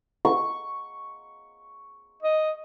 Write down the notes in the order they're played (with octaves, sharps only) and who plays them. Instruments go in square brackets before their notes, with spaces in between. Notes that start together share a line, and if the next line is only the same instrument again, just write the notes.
[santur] C#6
[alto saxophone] D#5